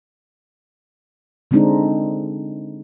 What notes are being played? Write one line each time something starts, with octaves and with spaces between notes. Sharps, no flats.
D3 G#3 C4 D4 D#4